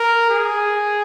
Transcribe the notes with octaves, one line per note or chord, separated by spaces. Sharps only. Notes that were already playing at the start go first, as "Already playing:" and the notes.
Already playing: A#4
G#4